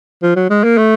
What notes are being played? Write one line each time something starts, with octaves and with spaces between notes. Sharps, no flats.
F3
F#3
G#3
A#3
A3